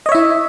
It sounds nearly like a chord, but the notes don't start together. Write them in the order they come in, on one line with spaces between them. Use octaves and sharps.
D#5 C#5 E5 E4